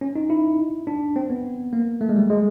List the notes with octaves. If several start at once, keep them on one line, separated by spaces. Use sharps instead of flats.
C#4
D#4
E4
D4
C4
B3
A#3
A3
G#3
G3
G#3